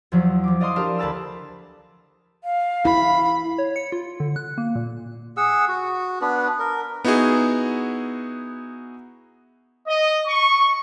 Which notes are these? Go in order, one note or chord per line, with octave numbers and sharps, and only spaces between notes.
E2 F3 F#3
F3 D6
D5 D#5 F5 A#5 C6 D#6
D4 G4 A#4 F5 A5
D2 B4 A5 A#5 E6
F5
E4 B5
C#5
C#7
F4
D3
F#6
A#3
A#2
G#4 F#5 E6
F#4
B3 D4 B4
A#4
B3 D#4 E4 F#4 G#4
D#5
C#6